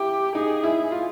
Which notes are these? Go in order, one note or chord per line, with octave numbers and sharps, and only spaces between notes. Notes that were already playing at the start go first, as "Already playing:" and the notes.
Already playing: E4 G4
D#4 G#4
E4
F4